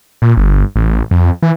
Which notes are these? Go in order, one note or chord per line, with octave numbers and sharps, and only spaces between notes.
A#2
G1
A1
F2
E3